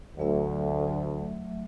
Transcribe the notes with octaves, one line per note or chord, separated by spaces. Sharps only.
D2 F#3 A3 E5